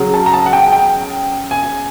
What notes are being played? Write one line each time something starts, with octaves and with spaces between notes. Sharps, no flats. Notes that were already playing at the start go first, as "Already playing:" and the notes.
Already playing: C#3 F#3
A5
A#5
A5
F#5
G5
G5
G#5